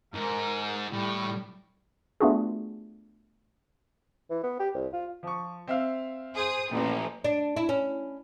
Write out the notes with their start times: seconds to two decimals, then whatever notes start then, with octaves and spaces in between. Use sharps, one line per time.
0.14 G#2 A#4
0.92 A2 G3
2.20 A3 B3 D4 F4 F#4 G#4
4.31 E3
4.43 B3
4.60 G4
4.75 C2
4.93 F4
5.23 F3 C#6
5.68 C4 E5 F5
6.34 G#4 C5 D#6
6.71 A1 A#2 F3
7.24 D4
7.57 E4
7.69 C#4